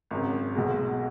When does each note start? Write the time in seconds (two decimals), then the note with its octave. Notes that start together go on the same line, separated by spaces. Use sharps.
0.11 G#1 F#2 C#3
0.55 B1 B2 G#3